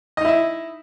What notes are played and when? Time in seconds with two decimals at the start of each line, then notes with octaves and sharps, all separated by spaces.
0.17 D#5
0.21 D#4
0.25 E4
0.28 E5